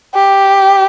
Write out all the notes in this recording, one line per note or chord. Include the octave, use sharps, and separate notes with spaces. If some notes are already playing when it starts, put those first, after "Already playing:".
G4